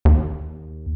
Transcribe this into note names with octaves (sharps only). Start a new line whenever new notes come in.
D#2